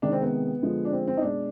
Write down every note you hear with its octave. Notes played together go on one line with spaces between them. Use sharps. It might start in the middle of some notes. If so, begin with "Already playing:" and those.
C3 D#3 G#3 D4
C4
B3
D3 F3 G#3
D4
C4
C4
D#4
B2 G#3 D4